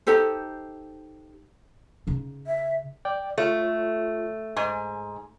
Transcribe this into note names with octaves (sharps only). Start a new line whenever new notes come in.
D#4 G4 A4 C5
C#3 D#4
E5
D5 G5
A3 F4 C#5
G#2 G#5